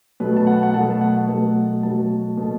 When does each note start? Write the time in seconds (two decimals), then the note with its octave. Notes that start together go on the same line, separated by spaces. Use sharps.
0.20 B2 F#3 A3 B4
0.37 A5
0.47 F#5
0.63 F#5
0.74 B2 F#3 A3 A5
1.01 F#5
1.28 B2 F#3 A3
1.83 B2 F#3 A3 A5
2.37 B2 A3